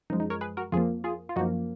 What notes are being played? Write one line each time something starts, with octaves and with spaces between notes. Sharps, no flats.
F#2 F3 G#3 D#4
D#4
A#4 C#5
G#4 B4
F#4 A#4
F2 F3 A#3 F4 G#4
F4 G#4
F4
F#2 F3 A#3 D#4 F#4